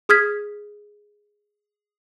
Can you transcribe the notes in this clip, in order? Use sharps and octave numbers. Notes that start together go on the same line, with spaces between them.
G#4 D#6 F6 G#6 B6